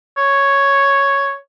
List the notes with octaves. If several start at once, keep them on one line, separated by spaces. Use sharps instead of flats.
C#5